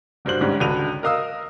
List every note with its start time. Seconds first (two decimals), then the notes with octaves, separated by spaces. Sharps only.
0.25 F#1 G2 F#4 C5 F#7
0.41 D2 G#2 G3 C#4
0.60 C#2 D3 F#4 B5 D#7 F7
1.03 A#4 D#5 F5 D#6 E6